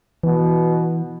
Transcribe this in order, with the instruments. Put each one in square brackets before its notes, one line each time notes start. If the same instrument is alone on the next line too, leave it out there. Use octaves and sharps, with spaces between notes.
[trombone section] B2 [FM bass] E3